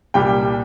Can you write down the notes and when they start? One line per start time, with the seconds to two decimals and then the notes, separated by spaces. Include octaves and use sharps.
0.14 C2 A#2 G3 G5